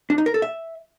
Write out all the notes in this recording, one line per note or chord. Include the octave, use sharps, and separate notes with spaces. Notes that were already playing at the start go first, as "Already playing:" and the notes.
D4
D#4
A#4
A4
E5